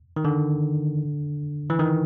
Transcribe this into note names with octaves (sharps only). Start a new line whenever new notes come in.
D#3
D3
E3
D#3